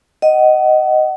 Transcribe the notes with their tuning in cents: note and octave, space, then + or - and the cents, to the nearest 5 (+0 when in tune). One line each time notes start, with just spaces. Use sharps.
D#5 +0 F#5 +30